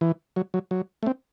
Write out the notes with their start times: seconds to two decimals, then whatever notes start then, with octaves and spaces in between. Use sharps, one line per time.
0.01 E3
0.36 F#3
0.54 F#3
0.71 F#3
1.03 A3
1.06 C4